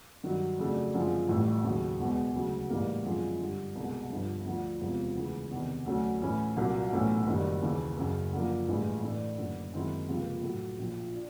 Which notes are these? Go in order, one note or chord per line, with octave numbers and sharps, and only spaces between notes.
G2 D#3 F#3
F2 C#3 F#3 A3 D4
F#2 D3 F3 G#3 C4
A1 A2 E3 G3
D#2 C#3 F#3
E1 E2 B2 G#3
D2 C#3 F#3
A1 G#2 E3 G3 A#3
F#2 D3 F3 G#3 C4
G2 D3 G3
C2 B2 G#3
G1 G2 D3 F3
D2 D3 F3
E1 E2 C3 F3
D2 C#3 E3
E2 C3 D#3
D2 D3 F#3 A3 C#4
A2 E3 A3 C#4 E4
C2 A#2 F#3 A#3
B1 A2 E3 A3 C#4
F#1 F#2 D#3 G3
D#2 C#3 E3
F#1 F#2 C#3
F#2 D3 F3 A#3
A1 G2 E3 G#3
A2 E3 A3 D4
F#1 F#2 D3
F#2 D#3 G#3 C4 E4
C#2 C3 F3 A#3
A2 F#3 A3
A#1 A#2 F3
D4